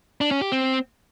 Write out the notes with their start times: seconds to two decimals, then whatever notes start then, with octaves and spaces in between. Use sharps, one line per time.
0.21 D4
0.31 C#4
0.42 G4
0.52 C4